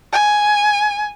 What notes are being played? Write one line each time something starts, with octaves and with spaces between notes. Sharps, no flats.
G#5